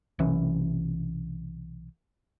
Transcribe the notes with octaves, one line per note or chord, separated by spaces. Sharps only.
B1 C3 E3 C#4